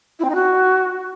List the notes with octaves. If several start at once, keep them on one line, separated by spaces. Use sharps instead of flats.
E4
C4
D#4
F#4